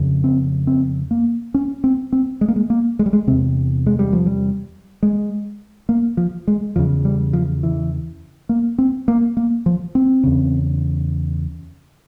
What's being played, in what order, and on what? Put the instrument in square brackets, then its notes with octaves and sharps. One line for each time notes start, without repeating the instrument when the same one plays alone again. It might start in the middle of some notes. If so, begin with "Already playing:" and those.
Already playing: [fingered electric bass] F2 C#3
C4
C4
A#3
C#4
C4
C4
G#3
A#3
G#3
A#3
G#3
G3
G#3
C3 C4
E2
G#3
G3
F3
G3
G#3
A#3
F3
G#3
E2 C#3 F3
G3
F3
E3
A#3
C4
A#3
A#3
F3
C4
E2 C#3